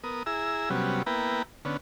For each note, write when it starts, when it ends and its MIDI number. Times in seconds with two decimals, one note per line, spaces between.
0.04 0.23 59
0.04 0.23 70
0.04 0.23 87
0.26 0.69 64
0.26 0.69 68
0.26 0.69 82
0.26 0.69 88
0.70 1.03 48
0.70 1.03 54
0.70 1.03 55
0.70 1.03 59
0.70 1.03 61
1.06 1.42 58
1.06 1.42 59
1.06 1.42 64
1.06 1.42 71
1.06 1.42 79
1.06 1.42 82
1.65 1.77 50
1.65 1.77 59
1.65 1.77 61